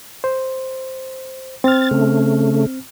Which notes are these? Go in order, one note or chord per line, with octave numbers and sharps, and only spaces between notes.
C5
C4 F6 A6
C#3 A3